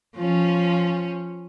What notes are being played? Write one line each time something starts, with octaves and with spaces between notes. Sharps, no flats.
F3 C#4